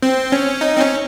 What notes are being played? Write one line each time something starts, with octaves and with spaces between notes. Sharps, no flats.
C4
C#4
D#4
C4
C#4